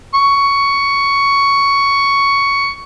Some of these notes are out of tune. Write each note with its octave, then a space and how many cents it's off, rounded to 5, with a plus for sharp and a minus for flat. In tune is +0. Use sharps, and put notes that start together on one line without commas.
C#6 +10